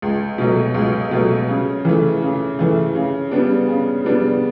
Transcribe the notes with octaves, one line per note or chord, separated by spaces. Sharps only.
C#2
B2 F#3 A3
C#2
B2 F#3 A3
C#3
E3 A3
C#3
E3 A3
C#3
G3 B3 D4
C#3
G3 B3 D4